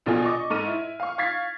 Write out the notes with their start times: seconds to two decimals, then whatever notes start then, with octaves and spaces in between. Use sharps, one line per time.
0.06 A#1 B2 F4 A4 G#5
0.25 D#5 C#6 D6
0.50 G#2 A4 C#6 F6 D#7
0.68 E4
1.00 F5 C#6
1.18 F5 C#6 G#6 A6 B6 C7